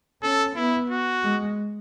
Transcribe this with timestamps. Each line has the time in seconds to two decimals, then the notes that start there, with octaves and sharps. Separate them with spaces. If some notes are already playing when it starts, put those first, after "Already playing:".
0.22 C#4 A4
0.55 B3 E4
0.90 F#4
1.23 G#3